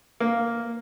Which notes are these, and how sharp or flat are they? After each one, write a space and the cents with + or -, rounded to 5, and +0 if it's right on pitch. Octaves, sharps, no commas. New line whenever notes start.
A#3 +0